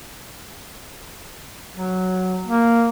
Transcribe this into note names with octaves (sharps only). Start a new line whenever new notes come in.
F#3
A#3